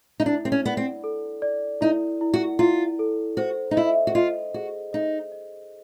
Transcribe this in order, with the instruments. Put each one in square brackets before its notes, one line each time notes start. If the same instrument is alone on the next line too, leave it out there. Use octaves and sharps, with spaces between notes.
[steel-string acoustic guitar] D#4
[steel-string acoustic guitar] D4 [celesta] E4
[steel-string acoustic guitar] C4
C#4
[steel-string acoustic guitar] B3 [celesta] D5
[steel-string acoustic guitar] C4
[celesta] A4
D5
[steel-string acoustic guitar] D#4 [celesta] E4
[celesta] E4
[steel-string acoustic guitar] F#4
[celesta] E4 [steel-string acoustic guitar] F4
[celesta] A4
[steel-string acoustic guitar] F#4 [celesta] C5
[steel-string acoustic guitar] D#4
[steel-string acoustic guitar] E4 [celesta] D#5
[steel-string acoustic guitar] F#4
[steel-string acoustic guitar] F4 [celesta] D#5
[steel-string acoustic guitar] F#4 [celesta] G#4
[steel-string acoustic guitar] D#4 [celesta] D#5
[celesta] D#5